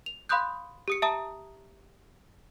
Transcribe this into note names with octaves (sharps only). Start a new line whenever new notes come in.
F7
F5 B5 C6 D#6 F#6 G6
G4 D#6 C#7
E5 A5 A#5 D#6